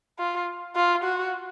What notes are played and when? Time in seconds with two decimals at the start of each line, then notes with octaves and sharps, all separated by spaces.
0.19 F4
0.76 F4
1.04 F#4